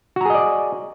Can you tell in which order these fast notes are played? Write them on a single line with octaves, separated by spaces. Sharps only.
F#4 A#5 G#4 D#5 D5